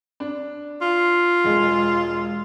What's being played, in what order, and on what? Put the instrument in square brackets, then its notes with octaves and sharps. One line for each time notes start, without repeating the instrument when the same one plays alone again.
[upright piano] D4
[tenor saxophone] F4
[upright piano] E1 G#3